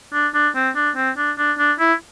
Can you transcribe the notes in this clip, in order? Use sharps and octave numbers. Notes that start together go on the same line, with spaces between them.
D4
D4
C4
D4
C4
D4
D4
D4
E4